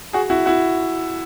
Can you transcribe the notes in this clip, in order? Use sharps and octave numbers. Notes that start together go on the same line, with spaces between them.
F#4 G#4
E4 F#4
E4 F#4